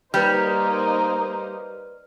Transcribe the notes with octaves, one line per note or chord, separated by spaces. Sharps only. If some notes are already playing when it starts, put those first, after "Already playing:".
G3 A#3 D#4 B4 C5 F6